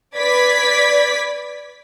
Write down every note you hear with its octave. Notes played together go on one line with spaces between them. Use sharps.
B4 D5 G#6 B6